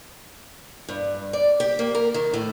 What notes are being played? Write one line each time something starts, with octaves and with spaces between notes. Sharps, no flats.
G2
D5
G4
A#3
A#4
D#3
A2